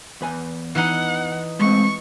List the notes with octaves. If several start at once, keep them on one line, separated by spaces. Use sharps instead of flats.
E2 B4 G#5
E3 D#4 F#5
G#3 A3 C4 C#6